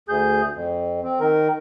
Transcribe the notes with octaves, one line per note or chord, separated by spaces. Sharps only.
D2 G#4 G6
F2
C4
D#3 A#4